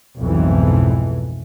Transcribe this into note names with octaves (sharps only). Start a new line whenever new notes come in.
B1 F2 G#2 E3